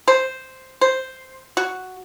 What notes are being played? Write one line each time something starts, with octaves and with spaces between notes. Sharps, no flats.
C5
C5
F#4